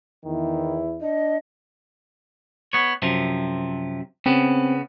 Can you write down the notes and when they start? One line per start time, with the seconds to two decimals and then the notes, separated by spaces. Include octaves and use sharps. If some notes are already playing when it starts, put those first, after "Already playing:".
0.25 E2 D#3 E4
1.01 D4 D#5
2.73 B3 C#5
3.02 F#2 C3 F3
4.26 C#3 B3 C4